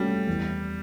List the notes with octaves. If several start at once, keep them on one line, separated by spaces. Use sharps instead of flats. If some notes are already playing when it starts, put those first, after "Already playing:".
Already playing: F#3 G3 A3 C#4 F#4 A4
E2